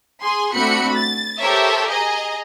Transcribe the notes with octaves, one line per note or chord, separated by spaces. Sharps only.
G#4 G#5 C6
A3 C4 D4 F#4 B5 C#7
A6
G4 A4 A#4 C5 C#5 E5
G#4 D#5 G#5 A#5